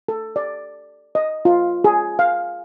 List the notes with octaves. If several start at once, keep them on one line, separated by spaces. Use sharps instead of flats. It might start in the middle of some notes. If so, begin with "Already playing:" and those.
A4
D5
D#5
F4
G#4
F5